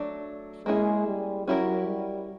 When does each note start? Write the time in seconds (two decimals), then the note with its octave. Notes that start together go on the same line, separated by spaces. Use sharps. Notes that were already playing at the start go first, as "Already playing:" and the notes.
Already playing: F#3 A3 D4
0.66 G#3 A#3 C#4 E4 G#4
1.07 G3
1.47 F#3 C#4 E4 G4 A#4
1.87 G3